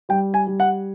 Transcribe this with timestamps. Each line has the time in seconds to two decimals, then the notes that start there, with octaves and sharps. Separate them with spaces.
0.09 G3 G5
0.34 G#5
0.47 G3
0.60 F#5